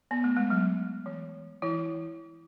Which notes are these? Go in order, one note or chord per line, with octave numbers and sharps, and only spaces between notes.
B3
A3
G#3
F#3
E3
E3 E4